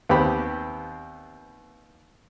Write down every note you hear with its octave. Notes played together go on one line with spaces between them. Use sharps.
D#2 B3 C4 G4 B5